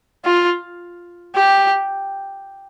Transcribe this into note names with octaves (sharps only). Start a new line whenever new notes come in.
F4
G4